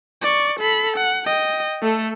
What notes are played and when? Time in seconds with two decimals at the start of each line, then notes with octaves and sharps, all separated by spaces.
0.22 D5 C#6
0.60 A4 B5
0.96 F#5
1.26 D#5 G5
1.82 A3 A4